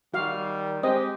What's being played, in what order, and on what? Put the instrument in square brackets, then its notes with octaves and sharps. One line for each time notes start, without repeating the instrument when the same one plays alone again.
[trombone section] D#3 G3 [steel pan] F#4 F5
[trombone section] G#3 G4 [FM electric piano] C4 [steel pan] D#5